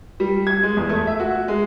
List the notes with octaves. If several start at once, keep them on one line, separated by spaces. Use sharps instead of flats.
G3
G#6
G#3
E2
A3
E5
F#4
G#3